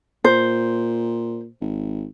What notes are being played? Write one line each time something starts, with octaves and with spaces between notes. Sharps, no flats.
A#2 C5
G#1